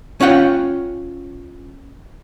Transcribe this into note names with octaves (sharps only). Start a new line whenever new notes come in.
C#4 F4 F#5 G5